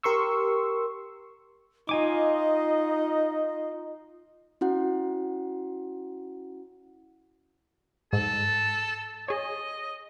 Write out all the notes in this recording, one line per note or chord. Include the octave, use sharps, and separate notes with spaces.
G4 A#4 C6 C#6 E6
D#4 F4 D#5 G#5 D6
C#4 E4 F#4 F#5
G#2 A4
G#4 C#5 D#5